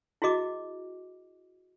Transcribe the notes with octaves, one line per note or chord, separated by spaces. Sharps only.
E4 F#4 G#4 D#5 D6